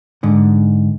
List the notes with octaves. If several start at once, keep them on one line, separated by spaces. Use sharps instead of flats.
G#2 D3